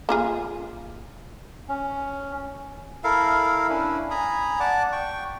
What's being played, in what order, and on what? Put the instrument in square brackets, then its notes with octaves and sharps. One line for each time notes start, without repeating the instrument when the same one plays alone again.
[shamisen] A#3 F4 G#4
[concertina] C#4
[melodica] E4 A4 A#4 F5
C#4 D4 E4
G#5 A#5 B5 D#6
D5 F#5 A5 D6
G5 C#6